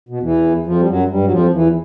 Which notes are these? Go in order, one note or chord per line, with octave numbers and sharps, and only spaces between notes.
B2
E2 E3
F2 F3
G3
F#2 F#3
G2 G3
F#3
F2 F3
E2 E3